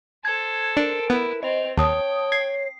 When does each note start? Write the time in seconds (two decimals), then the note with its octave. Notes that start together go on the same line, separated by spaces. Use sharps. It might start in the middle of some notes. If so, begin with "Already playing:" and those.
0.25 A4 C5 G#6
0.77 D4 A#4 D7
1.10 B3 E4 B4
1.43 C4 C5 D#5 F7
1.77 D#2 C#5 G5 A5 D#6
2.32 G#6 C7